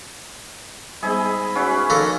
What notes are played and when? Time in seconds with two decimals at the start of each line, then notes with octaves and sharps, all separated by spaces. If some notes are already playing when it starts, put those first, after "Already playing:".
1.03 G#2 G3 B3 G#4 D#5 B5 E6
1.55 C#4 F#4 B4 E5 F#5
1.90 D#3 F3 A#3 D#4 A4